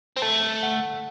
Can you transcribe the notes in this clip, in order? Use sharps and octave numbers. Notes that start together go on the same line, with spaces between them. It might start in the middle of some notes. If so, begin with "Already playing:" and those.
C4
A3 A5
F#5